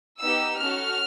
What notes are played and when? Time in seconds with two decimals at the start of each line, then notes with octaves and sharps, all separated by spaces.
0.21 B3 D#4 G4 E6
0.60 C#4 F#4 A4 F6